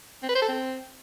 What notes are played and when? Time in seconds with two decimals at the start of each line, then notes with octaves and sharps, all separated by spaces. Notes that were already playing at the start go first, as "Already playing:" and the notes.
0.23 C4
0.29 B4
0.36 C5
0.42 A4
0.48 C4